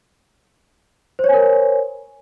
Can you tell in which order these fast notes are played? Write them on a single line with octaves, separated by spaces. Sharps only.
C5 C#5 G#5 A#4